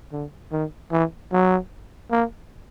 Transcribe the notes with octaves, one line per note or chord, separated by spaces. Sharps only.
D3
D#3
E3
F#3
A#3